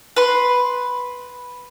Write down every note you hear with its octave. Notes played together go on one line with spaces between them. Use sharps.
B4 C6